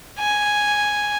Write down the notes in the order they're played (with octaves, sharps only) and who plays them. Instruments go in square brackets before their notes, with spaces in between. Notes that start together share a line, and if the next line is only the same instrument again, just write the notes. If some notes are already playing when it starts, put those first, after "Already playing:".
[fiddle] G#5